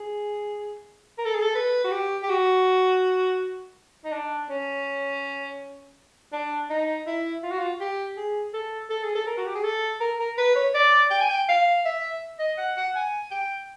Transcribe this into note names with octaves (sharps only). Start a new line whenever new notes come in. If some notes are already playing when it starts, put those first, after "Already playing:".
Already playing: G#4
A#4
A4
G#4
A4
B4
F#4
G4
G4
F#4
D#4
D4
C#4
D4
D#4
E4
F4
F#4
F4
G4
G#4
A4
A4
G#4
A4
A#4
F#4
G4
G#4
A4
A#4
A#4
B4
C#5
D5
G5
G#5
G5
F5
E5
D#5
F#5
F#5
G#5
G5